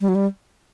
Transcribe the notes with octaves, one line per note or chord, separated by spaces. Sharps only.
G3
F#3
G3